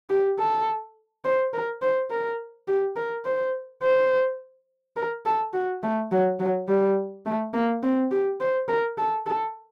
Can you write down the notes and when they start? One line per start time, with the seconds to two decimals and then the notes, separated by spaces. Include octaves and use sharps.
0.10 G4
0.39 A4
1.25 C5
1.53 A#4
1.82 C5
2.10 A#4
2.68 G4
2.96 A#4
3.25 C5
3.82 C5
4.96 A#4
5.26 A4
5.53 F#4
5.83 A3
6.12 F#3
6.39 F#3
6.68 G3
7.26 A3
7.54 A#3
7.83 C4
8.11 G4
8.40 C5
8.68 A#4
8.98 A4
9.26 A4